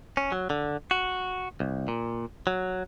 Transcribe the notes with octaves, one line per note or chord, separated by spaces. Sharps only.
C#4
F#3
D3
F#4
C2
A#2
F#3